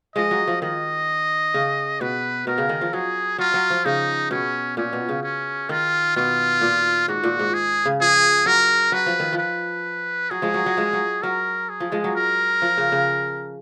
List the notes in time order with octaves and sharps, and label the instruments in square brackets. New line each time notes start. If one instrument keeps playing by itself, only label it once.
[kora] F3 G#3 [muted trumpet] D#5
[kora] F#3
F3
[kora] D#3 [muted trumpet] D#5
[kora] C#3
[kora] B2 [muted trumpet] B4
[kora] B2 [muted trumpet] A#4
[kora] C#3
D#3
F3
[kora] F#3 [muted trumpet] G#4
[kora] F#3 [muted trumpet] F4
[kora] F#3
F3
[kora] C#3 [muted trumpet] D#4
[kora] B2 [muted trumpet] C#4
[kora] A#2 [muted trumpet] C#4
[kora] B2
C#3
[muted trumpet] C#4
[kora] D#3 [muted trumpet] F4
[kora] B2 [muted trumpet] F4
[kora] A#2
[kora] G#2 [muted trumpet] F#4
[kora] A#2
G#2
[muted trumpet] G#4
[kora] C#3
[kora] F3 [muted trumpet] G#4
[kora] F#3 [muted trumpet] A#4
[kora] F#3 [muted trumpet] B4
[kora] F3
D#3
F3
[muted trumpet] B4
[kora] F#3 [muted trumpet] G#4
[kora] F3 G#3
F#3
F#3
F3 G#3
F#3
[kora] F#3 [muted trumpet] A#4
[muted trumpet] G#4
[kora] F3
F3 G#3
F#3
[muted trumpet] A#4
[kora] F3
C#3
C#3